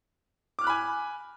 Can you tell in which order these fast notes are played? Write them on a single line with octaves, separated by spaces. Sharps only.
D6 F6 F#6 B5 G#5